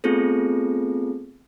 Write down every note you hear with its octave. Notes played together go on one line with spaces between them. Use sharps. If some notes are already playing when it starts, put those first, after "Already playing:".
A3 B3 C4 F4 G#4 A4